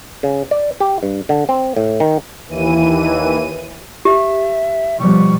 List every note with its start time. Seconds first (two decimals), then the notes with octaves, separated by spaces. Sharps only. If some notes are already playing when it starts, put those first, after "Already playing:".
0.23 C#3
0.51 D5
0.80 G4
1.03 G2
1.29 D3
1.49 C4
1.77 A2
2.00 D#3
2.47 D#2 E3 D#7
4.05 G4 E5
4.99 B2 F3 G3 C#6